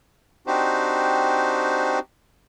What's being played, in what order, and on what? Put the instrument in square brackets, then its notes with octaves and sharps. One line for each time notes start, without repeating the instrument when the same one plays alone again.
[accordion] C4 D4 D#4 F#4 G4 C5